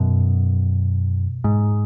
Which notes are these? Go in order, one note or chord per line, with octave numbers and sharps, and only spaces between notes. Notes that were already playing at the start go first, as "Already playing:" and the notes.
Already playing: F#2 B2
G#2